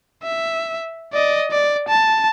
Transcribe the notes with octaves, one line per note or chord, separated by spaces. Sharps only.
E5
D5 D#5
D5
A5